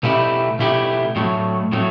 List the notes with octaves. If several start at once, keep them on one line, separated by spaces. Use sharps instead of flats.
B2 A3 E4 G4
B2 A3 E4 G4
A2 F#3 A3
A2 F#3 A3